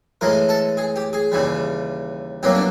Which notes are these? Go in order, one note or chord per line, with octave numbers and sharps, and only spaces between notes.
A2 E3 G#3 A#4
A4
G#4
G4
G#4
D#2 C#3 E3 G3
C2 B2 F#3 A#3 G4
D4